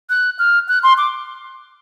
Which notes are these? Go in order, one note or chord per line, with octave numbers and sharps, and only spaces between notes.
F#6
F6
F#6
C6
D6